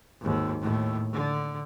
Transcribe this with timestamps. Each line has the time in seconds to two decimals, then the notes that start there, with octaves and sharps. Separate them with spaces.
0.21 G#1 D#2
0.61 D#2 A2
1.13 D3